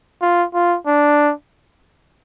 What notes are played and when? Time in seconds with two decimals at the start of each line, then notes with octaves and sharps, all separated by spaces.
0.22 F4
0.54 F4
0.87 D4